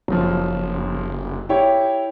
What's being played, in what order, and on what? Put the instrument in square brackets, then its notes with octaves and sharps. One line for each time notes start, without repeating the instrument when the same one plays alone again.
[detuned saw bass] F#1 [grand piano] F3 F#3
[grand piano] E4 G4 C#5